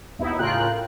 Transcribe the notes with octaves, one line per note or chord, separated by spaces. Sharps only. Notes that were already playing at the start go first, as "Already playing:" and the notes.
D#2 B2 D#4 E4
A2 C#3 F4 A#4 G5 F#6